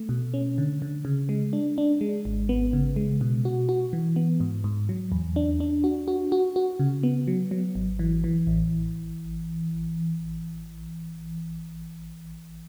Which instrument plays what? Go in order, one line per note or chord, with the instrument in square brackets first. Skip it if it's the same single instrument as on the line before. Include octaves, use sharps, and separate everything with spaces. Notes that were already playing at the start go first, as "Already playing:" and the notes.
Already playing: [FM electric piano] A3
B2
C#4
D3
D3
C#3
G#3
D4
D4
G#3
G#1
B3
C#3
G#3
B2
F#4
F#4
E3
B3
G#2
G#2
F#3
E2
D4
D4
F#4
F#4
F#4
F#4
C#3
B3
F#3
F#3
G#1
E3
E3
A1